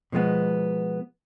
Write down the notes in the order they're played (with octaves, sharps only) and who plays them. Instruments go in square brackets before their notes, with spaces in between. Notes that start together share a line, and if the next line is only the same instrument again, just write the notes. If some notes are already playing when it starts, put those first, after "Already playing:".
[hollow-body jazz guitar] B2 F3 G#3 B3